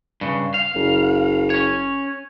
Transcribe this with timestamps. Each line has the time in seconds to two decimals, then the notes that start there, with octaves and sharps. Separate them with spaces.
0.21 G2 C#3
0.54 F5
0.74 F#1
1.50 C#4 C#5